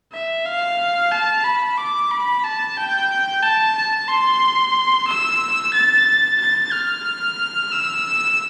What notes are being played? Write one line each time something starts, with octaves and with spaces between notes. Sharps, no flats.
E5
F5
A5
B5
D6
B5
A5
G5
A5
A5
C6
E6
A6
A6
F6
E6